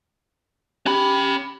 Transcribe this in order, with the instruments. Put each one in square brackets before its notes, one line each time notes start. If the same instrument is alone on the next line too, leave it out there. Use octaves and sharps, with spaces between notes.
[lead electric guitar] C#4 B5 [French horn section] G4